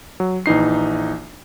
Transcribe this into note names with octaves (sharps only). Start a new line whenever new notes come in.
F#3
A#1 E3 D#4 C7